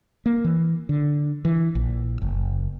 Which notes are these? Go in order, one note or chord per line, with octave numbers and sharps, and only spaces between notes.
A#3
E3
D3
E3
A#1
F#1